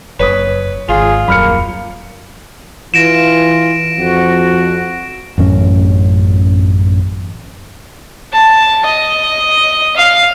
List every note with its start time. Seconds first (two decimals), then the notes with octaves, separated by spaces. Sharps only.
0.20 F#1 B4 C#5 D#6
0.89 G#1 F4 G#4
1.28 D#1 F#2 A#3 B5 F6 C#7
2.94 E3 F4 A#6 D7 E7
3.98 F2 F#4
5.38 A1 F#2 C#4
8.33 A5
8.85 D#5
9.96 F5